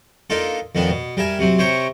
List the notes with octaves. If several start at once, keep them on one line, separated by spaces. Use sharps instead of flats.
A#3 D4 D#4 F4 A4
F2 D#3 B3 D4
B2
G3 A#4 E5 G#5
C3 F#3 C4
C3 C5 C#5 G5 A#5 C#6